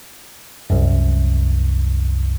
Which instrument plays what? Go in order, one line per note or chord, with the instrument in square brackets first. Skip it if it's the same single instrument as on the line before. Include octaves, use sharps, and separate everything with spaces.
[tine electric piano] C2 F#2